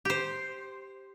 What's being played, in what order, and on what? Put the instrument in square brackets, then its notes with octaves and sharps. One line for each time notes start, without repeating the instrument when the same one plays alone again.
[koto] G4 C5